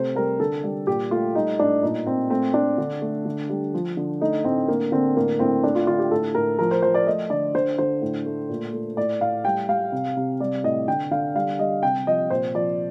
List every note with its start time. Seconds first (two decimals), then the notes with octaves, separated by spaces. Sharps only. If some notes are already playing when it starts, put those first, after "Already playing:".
Already playing: C3 A3 C5
0.15 G3 A#4
0.40 D3 A4
0.64 G3
0.87 A#2 G4
1.11 A3 F4
1.35 G3 D#4
1.59 A2 D4
1.83 A#2 D#4
2.06 A#2 C4
2.30 A3 C4
2.54 A3 D4
2.78 D3
3.02 A3
3.26 D3
3.49 G3
3.74 F3
3.97 D3
4.21 A3 D#4
4.44 A2 C4
4.68 D3 A#3
4.92 D3 C4
5.16 A2 A#3
5.39 A2 C4
5.63 A3 D4
5.75 F4
5.87 D3 F4
5.99 G4
6.11 A2 A4
6.35 A2 A#4
6.59 F3 A#4
6.71 C5
6.82 F3 C5
6.94 D5
7.07 A3 D#5
7.30 D3 D5
7.54 D3 C5
7.78 D3 C5
8.02 A2
8.26 A3
8.49 A#2
8.73 A3
8.97 A2 D5
9.20 A2 F5
9.45 G3 G5
9.69 G3 F5
9.92 C3
10.16 C3
10.40 G3 D5
10.64 A2 D#5
10.88 D3 G5
11.11 D3 F5
11.35 G3 F5
11.59 G3 D#5
11.83 C3 G5
12.07 F3 D#5
12.30 A#2 C5
12.54 F3 D5